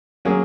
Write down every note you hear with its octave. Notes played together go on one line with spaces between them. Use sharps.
F#3 A#3 C#4 G#4